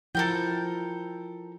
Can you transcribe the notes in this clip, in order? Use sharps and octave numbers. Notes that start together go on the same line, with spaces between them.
F3 E4 A4 A#4 G5